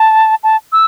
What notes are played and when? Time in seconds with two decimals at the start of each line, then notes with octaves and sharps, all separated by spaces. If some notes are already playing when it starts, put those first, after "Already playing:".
Already playing: A5
0.43 A5
0.72 E6